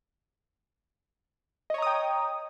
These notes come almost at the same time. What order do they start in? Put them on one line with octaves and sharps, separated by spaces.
D#5 C#5 A#5 D#6 G5